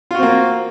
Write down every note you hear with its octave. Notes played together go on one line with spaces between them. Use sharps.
A#3 C4 F4 F#4